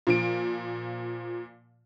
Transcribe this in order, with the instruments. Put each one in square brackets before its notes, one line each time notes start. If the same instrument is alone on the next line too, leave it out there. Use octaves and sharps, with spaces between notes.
[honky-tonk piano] A#2 F3 D7